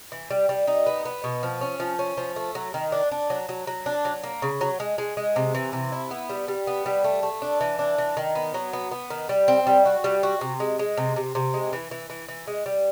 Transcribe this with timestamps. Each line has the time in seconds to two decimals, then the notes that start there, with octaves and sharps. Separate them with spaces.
0.12 E3
0.30 G3
0.49 G3
0.67 D#4
0.86 B3
1.05 B3
1.24 B2
1.43 F3
1.61 C#4
1.80 F3
1.99 C#4
2.17 F3
2.36 A3
2.55 F#3
2.74 D#3
2.92 D4
3.11 D4
3.30 F#3
3.49 F#3
3.67 F#3
3.86 D4
4.05 F#3
4.23 A#3
4.42 C#3
4.61 F#3
4.80 G#3
4.98 G#3
5.17 G#3
5.36 C3
5.55 E3
5.73 C3
5.92 E4
6.11 B3
6.30 G3
6.48 G3
6.67 B3
6.86 G3
7.04 A3
7.23 A3
7.42 D4
7.61 E3
7.79 D4
7.98 E3
8.17 D#3
8.35 B3
8.54 F#3
8.73 B3
8.91 B3
9.10 D#3
9.29 G3
9.48 C4
9.67 G3
9.86 F#4
10.04 G3
10.23 F#4
10.41 C3
10.60 G#3
10.79 G#3
10.97 C3
11.16 C3
11.35 C3
11.54 G#3
11.73 E3
11.91 E3
12.10 E3
12.28 E3
12.48 G#3
12.66 G3